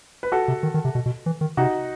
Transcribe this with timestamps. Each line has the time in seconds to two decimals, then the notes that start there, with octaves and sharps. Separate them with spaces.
0.23 B4
0.32 F#4 A4
0.48 C3
0.63 D#3
0.74 D#3
0.85 C3
0.95 B2
1.06 B2
1.26 E3
1.41 D#3
1.57 C3 D#4 F#4